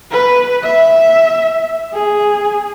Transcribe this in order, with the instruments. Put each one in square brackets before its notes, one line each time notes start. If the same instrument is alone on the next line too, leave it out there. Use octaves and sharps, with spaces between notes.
[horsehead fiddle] B4
E5
G#4